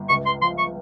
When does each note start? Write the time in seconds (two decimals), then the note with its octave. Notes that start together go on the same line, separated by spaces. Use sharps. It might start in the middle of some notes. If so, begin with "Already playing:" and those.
Already playing: G1
0.09 C#2 C#6
0.26 C6
0.42 F3 C6
0.58 C#6